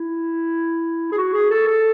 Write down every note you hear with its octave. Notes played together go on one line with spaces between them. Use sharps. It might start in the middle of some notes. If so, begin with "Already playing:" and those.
Already playing: E4
G#4
F#4
G#4
A4
A4